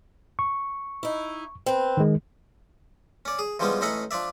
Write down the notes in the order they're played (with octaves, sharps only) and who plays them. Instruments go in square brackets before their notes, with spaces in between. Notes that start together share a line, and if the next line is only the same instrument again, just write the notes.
[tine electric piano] C#6
[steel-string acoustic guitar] D#4 E4
C4 B4
[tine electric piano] D#3 G#3
[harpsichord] C#4 D5
G#4
E3 F3 G3 G#3 B3 C#4
A1 C#4 D#4 A4 E5 F#5
F3 D4 D5 E5